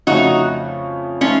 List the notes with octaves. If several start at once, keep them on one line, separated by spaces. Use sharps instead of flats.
F2 C#3 A3 C#4 D#4 F#4
F3 A3 C#4 D#4 F4